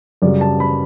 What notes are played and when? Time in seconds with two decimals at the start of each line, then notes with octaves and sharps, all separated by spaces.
0.22 F#2 C#3 G3 D5
0.41 A5
0.60 B5